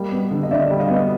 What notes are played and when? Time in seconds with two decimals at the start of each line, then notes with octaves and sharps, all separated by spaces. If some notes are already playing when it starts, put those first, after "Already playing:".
Already playing: G3 A#3 D#5
0.12 B3
0.31 D3
0.43 D#5
0.51 D3 D5 E5
0.71 G3
0.80 D#5 F5
0.90 B3